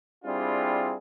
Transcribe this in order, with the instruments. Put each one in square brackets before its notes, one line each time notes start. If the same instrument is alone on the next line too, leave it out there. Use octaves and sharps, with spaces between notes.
[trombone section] G3 C4 D4 E4 F4 G#4